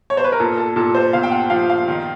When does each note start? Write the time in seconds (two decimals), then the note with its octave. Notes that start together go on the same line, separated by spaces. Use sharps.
0.10 C#5
0.17 C5
0.24 B4
0.32 A#4
0.40 A#2 A4
0.57 A4
0.76 A#2 A4
0.95 C5
1.13 A#2 F5
1.23 G5
1.32 F#5
1.50 F3 F5
1.70 F5
1.88 D#3